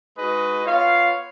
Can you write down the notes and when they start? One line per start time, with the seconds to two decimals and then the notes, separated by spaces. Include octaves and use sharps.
0.17 G#3 D#4 F#4 B4 D#5
0.65 B3 F4 C#5 F5